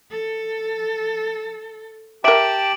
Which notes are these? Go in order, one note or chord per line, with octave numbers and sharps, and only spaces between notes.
A4
G4 A#4 E5 G5 A5 D6 D7 F#7